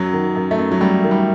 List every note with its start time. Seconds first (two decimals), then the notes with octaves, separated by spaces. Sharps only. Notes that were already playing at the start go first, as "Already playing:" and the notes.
Already playing: F#2 F#3
0.13 D#3
0.36 F#2
0.51 A3
0.59 F#2
0.72 F#3
0.81 F#2 G3
1.04 D#3
1.11 G3